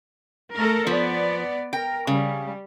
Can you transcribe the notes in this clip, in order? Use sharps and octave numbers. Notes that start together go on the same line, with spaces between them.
A3 A4 A#4
F3 B3 D5
A#4 G5
C#3 G3